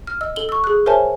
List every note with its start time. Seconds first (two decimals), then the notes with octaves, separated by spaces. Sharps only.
0.07 F6
0.21 D#5 E6
0.36 A4 F#7 G7
0.49 C#6 E6
0.64 G#4 F#6
0.86 A#4 C5 C#5 E5 G#5 A5